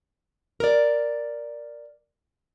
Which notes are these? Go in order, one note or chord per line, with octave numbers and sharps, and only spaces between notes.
A#4 D5